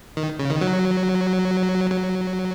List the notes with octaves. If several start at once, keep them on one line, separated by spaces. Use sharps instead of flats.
D#3
C#3
D#3
F#3
F#3